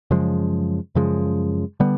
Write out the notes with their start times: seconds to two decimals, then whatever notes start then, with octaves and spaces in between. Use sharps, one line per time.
0.11 F#2 C#3 F3 G#3
0.95 F#2 C#3 F3 G#3
1.80 D3 G3 B3